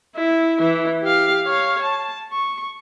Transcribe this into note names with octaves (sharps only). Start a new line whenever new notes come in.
E4
E3 E4
G4 F5
C#5 F5
A5
C#6